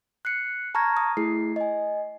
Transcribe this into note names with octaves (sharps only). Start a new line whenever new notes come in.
F#6 C7 C#7
A5 A#5 C#6 F6 G#6 A#6
D#6
A3 E4 G#4 C7
D#5 G#5